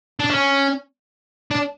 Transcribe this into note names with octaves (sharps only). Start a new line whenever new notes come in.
D4
C#4
D4